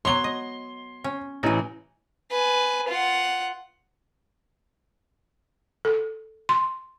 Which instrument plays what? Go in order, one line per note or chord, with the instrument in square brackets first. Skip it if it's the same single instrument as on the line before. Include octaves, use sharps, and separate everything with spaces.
[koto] F#3 B3 C#5 [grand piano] C6 G7
[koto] D#5
C#4
[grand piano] A1 E3 [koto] D#4 B4
[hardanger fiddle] B4 G#5
F4 F#5
[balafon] A4
C6